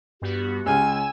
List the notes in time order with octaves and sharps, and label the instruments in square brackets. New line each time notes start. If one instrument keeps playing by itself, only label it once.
[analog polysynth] G2 B3 F#4 [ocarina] G4
[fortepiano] C#2 C#4 F6 [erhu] G#5 [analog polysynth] E6